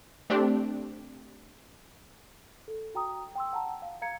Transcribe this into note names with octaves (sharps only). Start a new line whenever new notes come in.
A3 C4 D4 G4
A4
F#4 G5 A#5 D#6
G5 C6 E6
F#5 A5 A#5
F5
F5 A#5 G#6 C#7